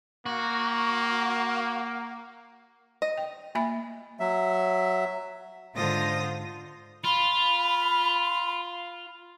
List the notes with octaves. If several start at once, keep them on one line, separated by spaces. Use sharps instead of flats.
A#3 F#4
D#5
G5
A#3 E5 B5
F#3 E5
G#2 D3 F4 C5 D#6 A#6
F4 B5